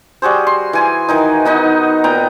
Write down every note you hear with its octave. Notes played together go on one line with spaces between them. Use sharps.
G3 F#4 G#4 C5
C6
E3 G#5 C6
D#3 E3 D#4
B3 D#4 D#5
A#2 B3 G5 A#5